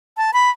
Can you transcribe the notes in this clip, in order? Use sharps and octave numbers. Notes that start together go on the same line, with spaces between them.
A5
B5